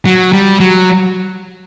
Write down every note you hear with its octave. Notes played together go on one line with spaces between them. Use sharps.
F#3
G3
F#3